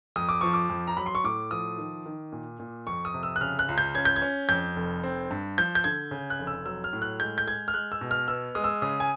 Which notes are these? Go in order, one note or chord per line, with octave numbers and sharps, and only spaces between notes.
F2 D#6
D6
F3 C#6
D6
F2
A#5
F#3 B5
C6
C#6
A2 D6
F3 D#6
D#3
D#3
A#2
A#2
F2 C#6
D#6
C3
E6
F#6
C#3 F6
F#6
C#2
G6
C#4 G#6
G6
G#6
C#4
F2 G6
F1
C4
G2
F3 G6
G6
D3 G#6
C#3
F#6
F1
E6
F#3 E6
F6
A2
F#6
G#3 G6
G6
G#3 G#6
F6
G#3 F#6
E6
B2
F6
B3 E6
G#3 D#6
E6
C#3 D#6
G#5